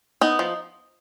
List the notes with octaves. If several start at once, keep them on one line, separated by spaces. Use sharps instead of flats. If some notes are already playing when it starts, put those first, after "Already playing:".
B3 D#4
F3